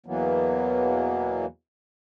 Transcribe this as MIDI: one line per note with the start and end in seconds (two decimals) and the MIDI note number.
0.06 1.46 40
0.06 1.46 47
0.06 1.46 52
0.06 1.46 54
0.06 1.46 58
0.06 1.46 59